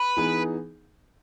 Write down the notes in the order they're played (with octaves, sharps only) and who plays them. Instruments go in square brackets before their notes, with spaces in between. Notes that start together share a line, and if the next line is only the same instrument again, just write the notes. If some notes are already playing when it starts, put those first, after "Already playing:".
Already playing: [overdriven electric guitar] B4
[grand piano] E3 B3 D#4 G#4